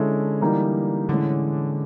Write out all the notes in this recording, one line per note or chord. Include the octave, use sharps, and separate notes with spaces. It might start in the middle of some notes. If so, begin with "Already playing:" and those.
Already playing: D3 G#3 C#4 E4 A4
E3 G3 A#3 D#4
A2 D3 E3 G#3 C#4